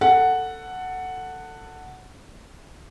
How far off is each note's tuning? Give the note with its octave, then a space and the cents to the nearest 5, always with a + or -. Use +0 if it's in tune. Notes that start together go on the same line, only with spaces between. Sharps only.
A4 +20 F#5 +0